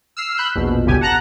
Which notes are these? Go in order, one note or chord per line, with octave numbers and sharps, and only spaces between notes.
E6 F6 C7
B5 E6 F#6 G6
A#1 E2 B2
G1 C#2 G2 B2 G4 G#5
F#5 A5 A#5 F#6 A#6